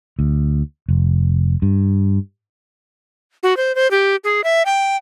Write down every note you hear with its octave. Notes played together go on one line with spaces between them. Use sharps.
D2
F1
G2
F#4
C5
C5
G4
G#4
E5
G5